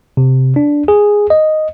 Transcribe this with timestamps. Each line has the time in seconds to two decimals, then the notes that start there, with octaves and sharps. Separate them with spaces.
0.17 C3
0.56 D4
0.88 G#4
1.30 D#5